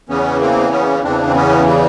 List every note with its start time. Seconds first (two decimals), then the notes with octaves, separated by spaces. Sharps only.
0.09 E2 C#3 E3 B3 C#4
0.41 A#3 C4
0.72 B3 C#4
1.03 E2 C#3 E3 C4 D4
1.26 C4
1.35 B3 C#4
1.66 G3